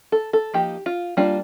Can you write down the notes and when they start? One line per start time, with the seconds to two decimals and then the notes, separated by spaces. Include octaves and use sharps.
0.12 A4
0.33 A4
0.54 F3 A#3 D#4 G4
0.86 F4
1.17 G3 A#3 D4 F4